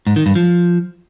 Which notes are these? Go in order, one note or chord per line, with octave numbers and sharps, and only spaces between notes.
G#2
D#3
G2
F3